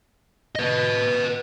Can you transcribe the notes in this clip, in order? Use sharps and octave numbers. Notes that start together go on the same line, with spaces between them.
B4 D#5